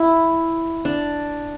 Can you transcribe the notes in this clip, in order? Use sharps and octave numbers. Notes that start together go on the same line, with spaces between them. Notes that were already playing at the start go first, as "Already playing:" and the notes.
Already playing: E4
D4